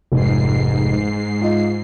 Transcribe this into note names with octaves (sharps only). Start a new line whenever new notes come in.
F1 G#2 C7
F4 D#5